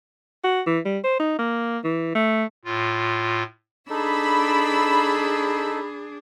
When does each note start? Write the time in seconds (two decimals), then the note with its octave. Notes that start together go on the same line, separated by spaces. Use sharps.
0.44 F#4
0.66 E3
0.85 G3
1.04 C5
1.20 D#4
1.39 A#3
1.84 E3
2.15 A3
2.65 A2 F4
3.90 D4 D#4 G#4 A4 B5 E6